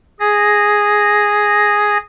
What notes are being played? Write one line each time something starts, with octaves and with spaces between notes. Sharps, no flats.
G#4 A#6